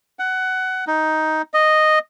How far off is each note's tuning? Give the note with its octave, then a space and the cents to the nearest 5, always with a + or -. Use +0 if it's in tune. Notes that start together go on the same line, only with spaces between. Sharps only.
F#5 +15
D#4 +10
D#5 -5